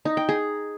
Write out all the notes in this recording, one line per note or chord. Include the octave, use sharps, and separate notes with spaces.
D#4
G5
G#4